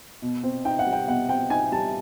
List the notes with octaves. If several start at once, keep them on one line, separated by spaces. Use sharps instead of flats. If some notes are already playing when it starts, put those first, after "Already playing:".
B2
C4
D#4 G5
F#5
G3
G5
B2 F#5
C4 G5
D#4 G#5
G3 A5